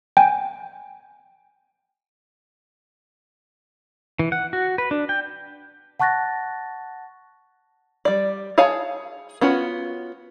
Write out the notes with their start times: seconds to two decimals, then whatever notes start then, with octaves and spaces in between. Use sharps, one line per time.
0.17 G5 G#5
4.19 E3
4.32 F#5
4.53 F#4
4.78 B4
4.91 D4
5.09 G5
6.00 F#5 A5 C#6 F#6 A6 A#6
8.05 G3 D5
8.58 G#4 C#5 F5 G#5 A5
9.41 B3 C#4 F4 F#4